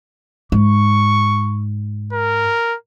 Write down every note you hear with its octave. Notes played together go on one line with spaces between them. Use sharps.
G#2 C#6
A#4